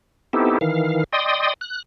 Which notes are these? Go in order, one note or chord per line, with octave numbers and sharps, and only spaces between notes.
B3 C4 D#4 E4 G4 A4
D#3 E3 F5
D5 D#5 G5 C6 D#6
F#6